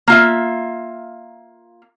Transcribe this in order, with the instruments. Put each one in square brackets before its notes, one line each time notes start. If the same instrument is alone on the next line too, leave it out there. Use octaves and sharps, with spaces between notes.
[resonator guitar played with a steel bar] A#3 F4 E5